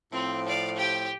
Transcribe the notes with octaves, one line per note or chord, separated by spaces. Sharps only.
A2 F3 C4
D5 F5
G4 G5